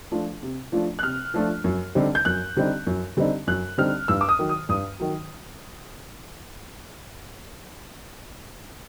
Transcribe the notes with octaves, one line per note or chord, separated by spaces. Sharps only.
F3 A3 D4 F4
C3
F3 A3 D4 F4
F#6
C3 F6
F3 A3 D4 F4
F#2
D3 G3 C4 D#4
G6
F#2 F#6
D3 G3 C4 D#4
F#2
D3 G3 C4 D#4
F#2 F#6
D3 G3 C4 D#4 F6
G2 E6
D6
D#6
D#3 F#3
D#6
G2 D#6
D#3 F#3